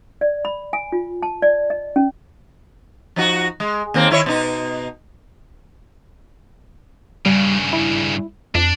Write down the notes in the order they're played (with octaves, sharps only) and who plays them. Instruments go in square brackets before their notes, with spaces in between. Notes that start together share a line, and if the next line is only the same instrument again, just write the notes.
[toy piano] D5
B5
G#5
F4
A5
D5
D#5
C#4
[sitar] F3 D#4 F#4
G#3
D#2 A#3 C4
D#3 E4 C#5
B2 D#4
[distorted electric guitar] G2 C#3 [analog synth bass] G3
[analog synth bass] E4
[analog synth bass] F2 [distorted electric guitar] D4